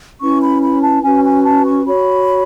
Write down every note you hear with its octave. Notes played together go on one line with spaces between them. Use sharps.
C#4 E4 B4 C#6
B5
B5
A5
C#4 F#4 B4 G#5
G#5
A5
C#6
F#4 C#5 B5